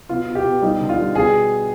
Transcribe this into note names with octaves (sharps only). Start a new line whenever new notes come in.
B2 F4
B2
G4
B2
G3 D#4
D3
F4
G3
B2 G#4